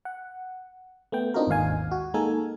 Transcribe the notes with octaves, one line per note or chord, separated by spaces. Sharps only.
F#5
A3 B3 G5
C4 D4 D#4 F4 F#4 A#4
G#1 D#2 G#2 F5 G#5
F#4
G#3 A#3 D#4 A4 A#4 G#5